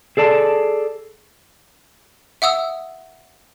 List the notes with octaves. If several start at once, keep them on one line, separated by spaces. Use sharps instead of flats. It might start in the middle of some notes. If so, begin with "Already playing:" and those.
G#4 A4 D5 A5
E5 F#5 D#6 E6